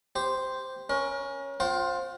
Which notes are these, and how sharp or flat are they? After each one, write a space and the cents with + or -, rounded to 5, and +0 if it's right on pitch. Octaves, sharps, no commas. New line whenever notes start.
G4 +0 C5 -5
C#4 +0 A#4 +35
F4 +25 C5 +15 G5 -35